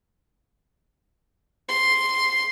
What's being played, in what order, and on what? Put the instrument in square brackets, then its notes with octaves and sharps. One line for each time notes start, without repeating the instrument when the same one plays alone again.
[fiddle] C6